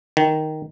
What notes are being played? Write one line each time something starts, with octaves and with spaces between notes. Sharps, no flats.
D#3